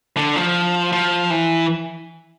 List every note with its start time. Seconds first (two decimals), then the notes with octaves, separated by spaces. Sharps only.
0.17 D3
0.36 F3
0.92 F3
1.30 E3